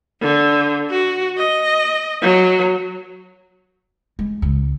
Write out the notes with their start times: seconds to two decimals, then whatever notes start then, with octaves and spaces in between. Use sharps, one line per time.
0.21 D3
0.90 F#4
1.37 D#5
2.22 F#3
4.19 G#3
4.42 C#2